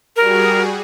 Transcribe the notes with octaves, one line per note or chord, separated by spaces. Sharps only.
G3 F#4 G#4 A#4